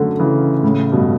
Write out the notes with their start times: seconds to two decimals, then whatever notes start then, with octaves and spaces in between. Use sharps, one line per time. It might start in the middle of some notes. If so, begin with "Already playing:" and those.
Already playing: F#2 D3 F#3 A3
0.19 C#3 E3
0.63 A2 C#3
0.92 G2 B2